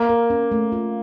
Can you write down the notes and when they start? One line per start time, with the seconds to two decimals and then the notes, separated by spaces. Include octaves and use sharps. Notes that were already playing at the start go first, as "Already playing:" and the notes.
Already playing: A#3
0.09 A#4
0.30 C#4
0.52 A3
0.72 F4